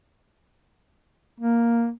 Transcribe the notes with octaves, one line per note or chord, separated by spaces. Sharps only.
A#3